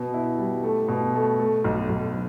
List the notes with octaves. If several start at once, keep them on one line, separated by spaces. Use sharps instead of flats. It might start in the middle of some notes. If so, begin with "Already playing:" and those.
Already playing: B2
E4
G3
A3
B2
A3
A3
B1
B1